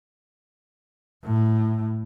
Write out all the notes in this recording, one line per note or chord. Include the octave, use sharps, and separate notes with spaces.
A2